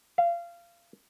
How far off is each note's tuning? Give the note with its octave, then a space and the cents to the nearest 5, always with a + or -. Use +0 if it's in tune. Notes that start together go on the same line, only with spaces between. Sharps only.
F5 -25